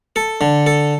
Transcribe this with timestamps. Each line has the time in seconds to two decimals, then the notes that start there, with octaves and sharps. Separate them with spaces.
0.16 A4
0.41 D3
0.66 A4